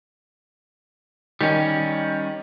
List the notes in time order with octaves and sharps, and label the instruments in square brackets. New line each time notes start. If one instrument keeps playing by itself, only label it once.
[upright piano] D#3 [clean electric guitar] G3 C#4